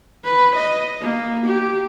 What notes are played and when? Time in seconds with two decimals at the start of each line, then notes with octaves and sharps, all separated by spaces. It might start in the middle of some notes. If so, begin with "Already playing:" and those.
0.24 B4
0.56 D#5
1.01 A#3
1.46 G4